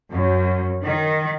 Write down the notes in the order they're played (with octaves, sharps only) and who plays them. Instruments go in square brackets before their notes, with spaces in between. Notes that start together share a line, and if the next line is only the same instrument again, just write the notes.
[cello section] F#2
D#3